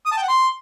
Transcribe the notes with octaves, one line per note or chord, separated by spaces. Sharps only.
D#6
A5
G5
F#5
C6